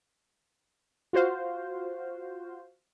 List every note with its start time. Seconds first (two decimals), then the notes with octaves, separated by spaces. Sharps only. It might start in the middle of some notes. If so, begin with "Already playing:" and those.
1.13 F4 F#4 C5 F5